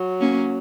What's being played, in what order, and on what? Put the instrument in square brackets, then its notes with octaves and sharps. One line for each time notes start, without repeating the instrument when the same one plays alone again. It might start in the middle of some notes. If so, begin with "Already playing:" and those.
Already playing: [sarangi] F#3
[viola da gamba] A#3 C#4